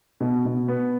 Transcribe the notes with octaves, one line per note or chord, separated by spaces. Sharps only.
B2
B2
B3